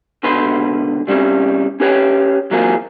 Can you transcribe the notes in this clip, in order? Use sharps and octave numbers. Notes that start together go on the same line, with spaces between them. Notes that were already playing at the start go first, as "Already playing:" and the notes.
C#2 B2 D3 B4 C6
C3 G3 A#3 C4 C#4
C#4 G4 B4 C#5 G5
E3 F#3 A#3 C4 F4 G#4